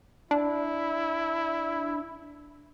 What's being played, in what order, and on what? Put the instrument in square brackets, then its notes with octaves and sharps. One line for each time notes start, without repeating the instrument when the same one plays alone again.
[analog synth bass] D4 [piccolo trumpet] E4